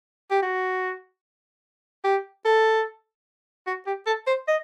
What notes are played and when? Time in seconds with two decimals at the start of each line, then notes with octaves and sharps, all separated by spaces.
0.31 G4
0.42 F#4
2.04 G4
2.45 A4
3.67 F#4
3.87 G4
4.06 A4
4.27 C5
4.48 D#5